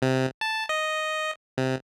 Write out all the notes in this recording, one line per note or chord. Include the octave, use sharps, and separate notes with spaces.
C3
A5
D#5
C3